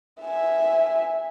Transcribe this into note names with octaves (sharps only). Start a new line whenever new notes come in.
E5 G#5